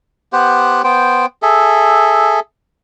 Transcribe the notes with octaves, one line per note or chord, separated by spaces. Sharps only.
B3 G4 C5 F#5
B3 C5 G5
G#4 A4 E5